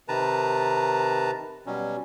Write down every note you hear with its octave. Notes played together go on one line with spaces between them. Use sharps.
C3 D#3 B4 A5 A#5
B2 F#3 G3 C#4